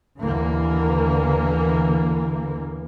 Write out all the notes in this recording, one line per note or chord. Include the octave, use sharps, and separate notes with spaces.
D#2 D3 E3 A#3